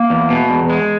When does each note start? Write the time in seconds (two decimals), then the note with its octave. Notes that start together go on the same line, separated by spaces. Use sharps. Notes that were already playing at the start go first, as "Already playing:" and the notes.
Already playing: A#3
0.10 E2
0.30 B2
0.50 E2
0.70 G#3